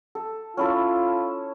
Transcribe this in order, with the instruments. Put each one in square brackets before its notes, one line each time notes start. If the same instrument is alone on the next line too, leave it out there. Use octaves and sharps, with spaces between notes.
[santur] A4
[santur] C#4 E4 A4 [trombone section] F4